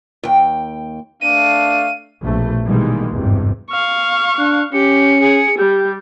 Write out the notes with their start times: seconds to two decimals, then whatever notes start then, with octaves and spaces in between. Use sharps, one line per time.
0.23 D#2 G5
1.22 A3 D4 F5 D#7
2.23 A#1 B2 A3
2.66 B2 D#3 E3 G3 G#3 A#3
3.12 G#1 E2 G2 C3
3.71 F5 C#6
4.38 D4 F#6
4.73 C#4 G4 C#7
5.20 G#4
5.59 G3 G4 G6